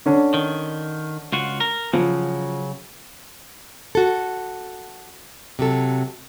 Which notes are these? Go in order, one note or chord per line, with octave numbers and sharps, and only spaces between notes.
D3 C#4 D4
D#3
C#2 F4 F#4
A#4
C#3 F3 F#3
F#4 A4
C3 F#3 A4